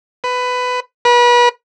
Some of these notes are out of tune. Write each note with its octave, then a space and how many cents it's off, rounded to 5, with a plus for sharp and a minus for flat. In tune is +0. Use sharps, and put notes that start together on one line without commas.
B4 +15
B4 -35